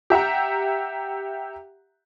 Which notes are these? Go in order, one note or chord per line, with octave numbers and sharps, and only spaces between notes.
G4 E5 F#5 A#5